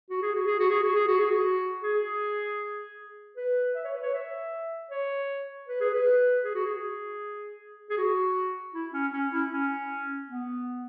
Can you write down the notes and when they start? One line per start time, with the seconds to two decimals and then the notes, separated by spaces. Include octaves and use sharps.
0.10 F#4
0.22 G#4
0.35 F#4
0.47 G#4
0.59 F#4
0.71 G#4
0.83 F#4
0.95 G#4
1.08 F#4
1.20 G#4
1.31 F#4
1.83 G#4
3.37 B4
3.75 E5
3.84 C#5
3.93 B4
4.03 C#5
4.14 E5
4.90 C#5
5.68 B4
5.80 G#4
5.94 B4
6.44 G#4
6.55 F#4
6.65 G#4
7.90 G#4
7.98 F#4
8.74 E4
8.93 C#4
9.13 C#4
9.32 E4
9.51 C#4
10.28 B3